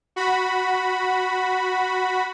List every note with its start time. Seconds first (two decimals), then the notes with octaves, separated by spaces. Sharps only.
0.16 F#4 B5